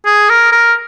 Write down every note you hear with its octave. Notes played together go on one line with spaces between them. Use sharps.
G#4
A#4
A#4